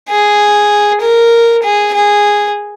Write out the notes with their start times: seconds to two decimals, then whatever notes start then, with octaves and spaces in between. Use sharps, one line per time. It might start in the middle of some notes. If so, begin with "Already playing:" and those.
0.09 G#4
1.01 A#4
1.63 G#4
1.94 G#4